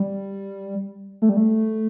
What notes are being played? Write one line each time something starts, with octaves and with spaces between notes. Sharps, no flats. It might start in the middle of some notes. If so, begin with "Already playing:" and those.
Already playing: G3
A3
G3
A3